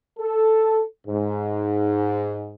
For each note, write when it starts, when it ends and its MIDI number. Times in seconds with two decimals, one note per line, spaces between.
0.20 0.82 69
1.07 2.54 44